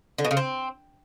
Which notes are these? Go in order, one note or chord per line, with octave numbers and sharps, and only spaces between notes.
D3
B2
C#3
C4